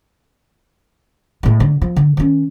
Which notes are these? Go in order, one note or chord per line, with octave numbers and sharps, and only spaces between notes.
A2 G#3
D3
F3
D3
D#3 C#4